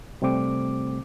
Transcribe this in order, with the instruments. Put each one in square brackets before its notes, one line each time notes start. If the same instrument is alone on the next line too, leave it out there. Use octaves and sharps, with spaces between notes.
[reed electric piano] C3 G3 A3 C4 D6